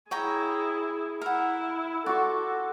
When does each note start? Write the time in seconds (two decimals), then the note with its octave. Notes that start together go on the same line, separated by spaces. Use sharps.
0.11 E4 G#4 C#5 G5 A#5
1.21 E4 A#4 F#5
2.06 F#4 A4 D5 C6 C#6